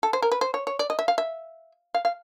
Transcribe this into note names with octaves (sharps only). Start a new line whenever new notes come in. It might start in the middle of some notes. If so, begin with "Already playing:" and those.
A4
C5
A#4
B4
C5
C#5
C#5
D5
D#5
E5
F5
E5
F5
F5